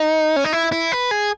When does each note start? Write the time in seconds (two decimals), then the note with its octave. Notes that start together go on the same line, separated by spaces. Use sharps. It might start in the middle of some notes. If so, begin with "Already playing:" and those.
Already playing: D#4
0.36 C#4
0.44 D#4
0.53 E4
0.72 E4
0.92 B4
1.11 G#4